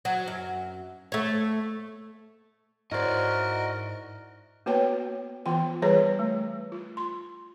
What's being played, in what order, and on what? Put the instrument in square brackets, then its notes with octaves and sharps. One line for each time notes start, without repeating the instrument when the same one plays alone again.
[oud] F#3
F#2
A3 C#5
[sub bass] G#2 [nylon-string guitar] E4 C5 [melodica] F#4 A#4 [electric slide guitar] D5 D#5
[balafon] A#3 B3 F#4 B4 C#5 G5
E3 B3 F4 G5
E3 G3 G#4 B4 C#5 A#5
A3
F4
C6